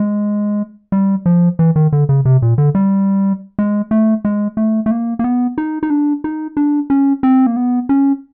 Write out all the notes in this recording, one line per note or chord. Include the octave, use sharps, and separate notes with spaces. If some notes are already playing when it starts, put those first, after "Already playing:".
Already playing: G#3
G3
F3
E3
D#3
D3
C#3
C3
A#2
D3
G3
G#3
A3
G#3
A3
A3
A#3
A#3
B3
D#4
D#4
D4
D#4
D4
C#4
C4
A#3
B3
C#4